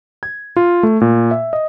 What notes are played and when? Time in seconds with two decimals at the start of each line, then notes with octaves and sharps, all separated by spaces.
0.23 G#6
0.56 F4
0.83 A3
1.01 A#2
1.31 E5
1.53 D#5